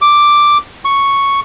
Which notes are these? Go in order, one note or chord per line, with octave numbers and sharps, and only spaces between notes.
D6
C#6